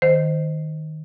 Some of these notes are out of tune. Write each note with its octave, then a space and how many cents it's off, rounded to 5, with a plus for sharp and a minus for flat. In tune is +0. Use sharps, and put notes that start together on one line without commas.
D#3 +0 C5 -10